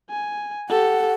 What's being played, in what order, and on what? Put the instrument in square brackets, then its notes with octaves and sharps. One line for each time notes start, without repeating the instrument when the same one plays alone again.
[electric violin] G#5
[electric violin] G4 A4 [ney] F#5